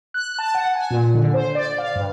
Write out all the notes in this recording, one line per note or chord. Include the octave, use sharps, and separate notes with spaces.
F#6
A5
F#5
G#5
A#2
D3
C5
D5
F5
G2